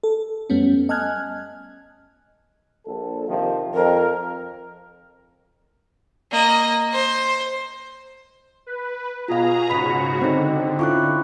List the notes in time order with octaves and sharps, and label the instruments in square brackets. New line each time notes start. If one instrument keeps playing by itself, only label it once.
[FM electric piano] A4
F#2 G3 A3 B3 C#4
D#5 G#5 A5 F6 F#6 G#6
[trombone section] A#1 A4
C3 D#3 F3
[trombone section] F2 [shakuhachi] A#4
[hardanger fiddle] A#3 D#5
C5
[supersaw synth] B4
[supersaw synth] B2 G#4 A#5 [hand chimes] F4 F5
[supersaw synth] G#2 C#3 F#4 [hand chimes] B5 B6
[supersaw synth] D3 [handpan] C4 D#4
[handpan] C#4 E4 F4 [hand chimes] C#6 D6 F#6